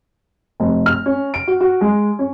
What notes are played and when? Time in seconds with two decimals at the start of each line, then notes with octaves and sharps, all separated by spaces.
0.60 F1
0.86 F6
1.06 C#4
1.34 D7
1.47 F#4
1.61 F#4
1.81 G#3
2.19 C#4